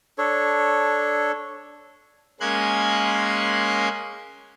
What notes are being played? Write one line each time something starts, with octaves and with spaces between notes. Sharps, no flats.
D4 A4 C#5
G#3 A#3 C#4 C6 F#6 G#6